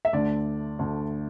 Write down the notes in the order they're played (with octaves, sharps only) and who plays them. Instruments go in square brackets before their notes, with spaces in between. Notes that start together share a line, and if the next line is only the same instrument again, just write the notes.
[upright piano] E5
D2 D3 A3 D5
D2 D3 A3